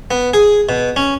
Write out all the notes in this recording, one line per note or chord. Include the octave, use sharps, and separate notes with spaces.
B3
G#4
B2
C#4